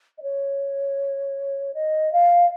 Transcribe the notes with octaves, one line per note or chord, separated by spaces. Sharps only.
D#5
C#5
D#5
F5